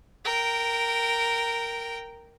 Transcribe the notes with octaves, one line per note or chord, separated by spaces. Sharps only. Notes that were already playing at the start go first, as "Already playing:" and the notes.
A#4 G5